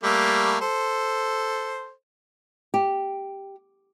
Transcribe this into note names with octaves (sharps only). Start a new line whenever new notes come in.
G3 A3 A#3
A4 C5
G4